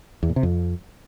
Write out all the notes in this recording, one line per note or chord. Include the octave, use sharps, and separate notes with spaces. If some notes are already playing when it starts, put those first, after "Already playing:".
E2
A#2
C3
F2